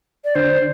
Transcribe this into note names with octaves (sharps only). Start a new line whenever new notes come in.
D5
D3 C5